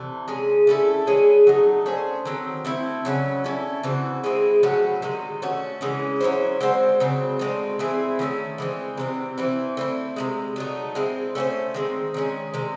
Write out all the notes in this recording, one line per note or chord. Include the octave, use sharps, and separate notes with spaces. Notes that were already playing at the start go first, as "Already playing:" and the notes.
Already playing: C3 E3 A3
G#3 C#4 G#4
A3 C#4 E4 A4
E3 G#3 C#4 G#4
F#3 A3 D#4
A3 C#4 G#4 C5
D#3 F#3 C4
A3 C4 E4
C#3 F#3 C#4
A3 C#4 E4
C#3 E3 C4 F#4
G#3 C4 E4 G#4
A2 F#3 C#4 F#4
C3 D#3 G#3
A3 C#4 F#4
C#3 E3 G#3 C#4
F#3 C#4 E4 C5
G#3 C4 F#4 C5
C#3 F#3 C4
A2 G#3 C4
E3 C4 E4 G#4
D#3 A3 C#4 E4
E3 G#3 C4
C3 E3 C4
E3 C4 E4
A3 C4 E4
C3 E3 G#3
F#3 A3 D#4
G#3 C4 E4
A3 C#4 F#4 C5
D#3 G#3 C4
D#3 G#3 C#4
C3 D#3 G#3